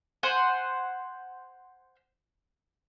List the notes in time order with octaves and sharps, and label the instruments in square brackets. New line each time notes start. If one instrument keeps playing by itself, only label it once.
[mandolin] C5 F#5 G#5